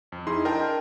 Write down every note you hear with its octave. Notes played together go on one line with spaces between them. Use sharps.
F2
D#4 E4 G#4 C6
D4 A#4 D#5 G5 A5